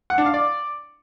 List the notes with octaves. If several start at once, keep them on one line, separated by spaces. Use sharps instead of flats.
F#5
D4
F5
D5